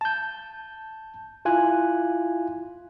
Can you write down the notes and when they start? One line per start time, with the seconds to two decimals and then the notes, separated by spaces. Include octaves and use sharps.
0.01 A5 G6
1.45 E4 F4 G#5 F#6